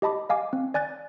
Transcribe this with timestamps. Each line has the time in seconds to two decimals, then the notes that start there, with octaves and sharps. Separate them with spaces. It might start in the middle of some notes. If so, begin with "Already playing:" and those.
0.02 G4 D#5 A5 B5 D6
0.29 D#5 F5 G#5 D6
0.53 C4
0.74 D5 G#5 F#6 A6